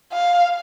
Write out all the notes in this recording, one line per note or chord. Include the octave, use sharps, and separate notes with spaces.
F5